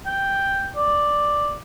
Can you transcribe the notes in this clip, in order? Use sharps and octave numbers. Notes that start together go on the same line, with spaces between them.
G5
D5